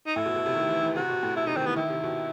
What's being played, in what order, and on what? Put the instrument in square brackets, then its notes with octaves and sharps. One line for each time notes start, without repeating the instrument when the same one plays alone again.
[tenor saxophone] D#4
[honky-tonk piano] A2 [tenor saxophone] E4
[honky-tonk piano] B2
B2
C3
D#3
E3
E3
[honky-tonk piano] C3 [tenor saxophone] F#4
[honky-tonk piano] B2
A2
[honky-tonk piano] B2 [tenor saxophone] E4
[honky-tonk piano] C3 [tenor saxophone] D#4
[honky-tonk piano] D#3 [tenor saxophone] C4
[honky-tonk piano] E3 [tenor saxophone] B3
[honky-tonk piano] D#3 [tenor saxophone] E4
[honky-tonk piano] C3
B2